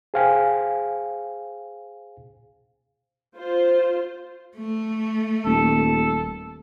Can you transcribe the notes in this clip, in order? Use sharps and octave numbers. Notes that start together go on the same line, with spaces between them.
G#4 C5 F5 G5 G#5
F4 C5
A3
D#1 A4